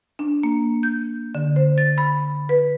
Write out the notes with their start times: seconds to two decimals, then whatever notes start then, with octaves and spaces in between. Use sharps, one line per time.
0.19 D4
0.43 A#3
0.83 G6
1.35 D3
1.56 C5
1.78 A6
1.98 B5
2.49 B4